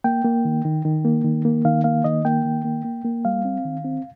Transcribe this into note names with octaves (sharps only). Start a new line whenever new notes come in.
A#3 G5
A#3
D#3
D#3
D#3
A#3
D#3
A#3
D#3 F5
A#3 F5
D#3 D#5
A#3 G5
D#3
A#3
A#3
A#3
G3 F5
C4
D#3
C4